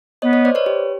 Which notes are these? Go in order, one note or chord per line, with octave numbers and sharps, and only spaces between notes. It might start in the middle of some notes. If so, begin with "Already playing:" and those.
B3 C#5 D#5
C#5 D#5
C5 D5
B4 C#5
G4